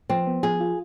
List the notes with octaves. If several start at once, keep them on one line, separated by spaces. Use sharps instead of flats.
F3 C4
B3
F3 G#4
F4